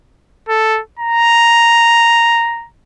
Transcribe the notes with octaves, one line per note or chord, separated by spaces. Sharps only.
A4
A#5